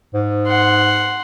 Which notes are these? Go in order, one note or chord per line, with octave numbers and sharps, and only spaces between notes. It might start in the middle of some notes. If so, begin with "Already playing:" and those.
G#2
F#5 C6